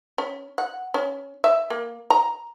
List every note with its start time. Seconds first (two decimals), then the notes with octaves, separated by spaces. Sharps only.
0.18 C#4
0.58 F#5
0.94 C#4
1.44 E5
1.70 A#3
2.10 A#5